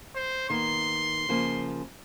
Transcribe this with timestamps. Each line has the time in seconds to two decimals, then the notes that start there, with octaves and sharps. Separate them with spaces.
0.16 C5
0.50 D#3 A#3 B3 C6
1.29 C#3 F3 A#3